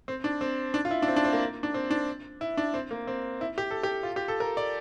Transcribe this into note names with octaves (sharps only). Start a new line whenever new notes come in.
C4
D4
C4
D4
F4
E4
D4
C4
D4
C4
A#3
D4
C4
D4
E4
D4
C4
A#3
C4
E4
G4
A4
G4
F4
G4
A4
A#4
D5